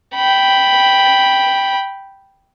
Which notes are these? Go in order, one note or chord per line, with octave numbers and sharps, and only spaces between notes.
G5 B5